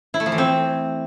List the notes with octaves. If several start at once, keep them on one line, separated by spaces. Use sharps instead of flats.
E4
A3
F3
E3
C4